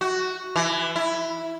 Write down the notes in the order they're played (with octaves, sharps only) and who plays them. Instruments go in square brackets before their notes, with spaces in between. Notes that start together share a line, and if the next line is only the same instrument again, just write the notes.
[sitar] F#4
E3
E4